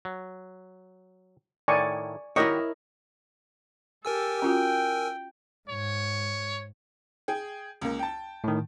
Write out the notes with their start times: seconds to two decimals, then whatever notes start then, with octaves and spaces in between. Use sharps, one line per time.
0.05 F#3
1.68 A2 D#3 D5 G#5 C#6
2.36 D#3 E4 F#4 G4 A#4 C#5 D#5
4.05 G4 A4 A#4 G#5 E6
4.42 C#4 F4 F#4 G5
5.69 G#2 C#5
7.28 G#4 G5
7.82 C#2 A#3
7.99 G5 A5
8.44 A2 D#3